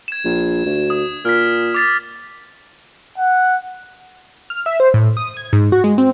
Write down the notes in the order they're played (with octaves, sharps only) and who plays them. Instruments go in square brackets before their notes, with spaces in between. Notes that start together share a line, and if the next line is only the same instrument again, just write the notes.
[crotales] G#6 E7
[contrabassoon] A#1
D2
[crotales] D#6
[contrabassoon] A#2 [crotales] F6 B6
[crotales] D6 A6 B6
[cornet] F#5
[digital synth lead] F6
E5
C5
A2
D#6
G#6
G#2
F#4
G#3
C4